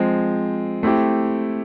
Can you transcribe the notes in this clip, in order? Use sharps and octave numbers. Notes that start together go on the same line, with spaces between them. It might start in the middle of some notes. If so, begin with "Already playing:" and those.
Already playing: F3 G#3 C4
A3 C4 E4 G4